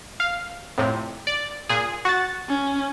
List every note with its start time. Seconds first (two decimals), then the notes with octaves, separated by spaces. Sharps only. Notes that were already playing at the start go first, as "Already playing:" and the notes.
0.20 F5
0.78 F2 A2 C3
1.27 D5
1.69 A#2 G#4
2.05 F#4 A6
2.49 C#4